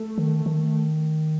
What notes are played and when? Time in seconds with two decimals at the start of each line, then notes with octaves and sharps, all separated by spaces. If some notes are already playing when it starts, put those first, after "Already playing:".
Already playing: A3
0.18 D#3
0.46 D#3